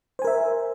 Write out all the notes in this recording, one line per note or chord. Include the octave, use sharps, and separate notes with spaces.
A#4 C5 E5 G#5